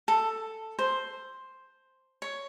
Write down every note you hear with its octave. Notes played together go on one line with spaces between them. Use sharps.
A4
C5
C#5